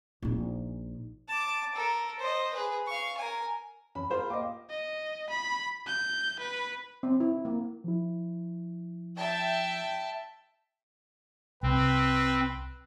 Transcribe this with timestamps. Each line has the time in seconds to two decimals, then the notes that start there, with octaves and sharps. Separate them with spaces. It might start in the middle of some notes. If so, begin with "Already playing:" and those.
0.22 A#1 D#4
1.28 A5 D6
1.75 A4 A#4
2.19 C5 D#5
2.53 G#4 B4
2.87 F5 C#6
3.18 A#4 G#5
3.95 F#2 E3 C#4 B5
4.10 F4 G4 G#4 A#4 C5 B5
4.30 A#3 D#5 F5 G5 D6
4.70 D#5
5.29 B5
5.87 G6
6.39 B4
7.03 C4
7.20 E4
7.45 A#3
7.84 F3 E4
9.18 E5 G5 A5
11.63 C2 C4 B4